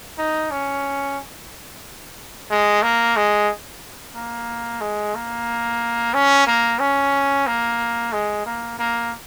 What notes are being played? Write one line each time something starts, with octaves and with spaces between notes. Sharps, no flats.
D#4
C#4
G#3
A#3
G#3
A#3
G#3
A#3
C#4
A#3
C#4
A#3
G#3
A#3
A#3